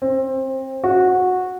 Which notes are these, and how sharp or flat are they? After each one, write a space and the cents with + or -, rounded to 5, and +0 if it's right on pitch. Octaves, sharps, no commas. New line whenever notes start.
C4 +25
F#4 -10